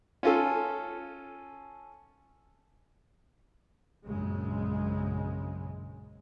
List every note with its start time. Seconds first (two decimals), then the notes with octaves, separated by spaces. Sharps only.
0.23 C#4 F4 A4
4.07 A#1 F#2 C#3 G#3